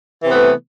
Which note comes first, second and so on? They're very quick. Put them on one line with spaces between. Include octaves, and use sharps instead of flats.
E3 C3 B3 A3